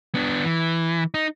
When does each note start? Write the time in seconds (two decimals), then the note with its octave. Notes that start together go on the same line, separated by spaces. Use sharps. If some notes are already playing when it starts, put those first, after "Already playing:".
0.15 B3 D4
0.44 E3
1.14 D#4